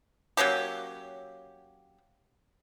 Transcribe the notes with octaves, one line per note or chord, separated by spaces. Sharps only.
F#3 A#3 C#4 G4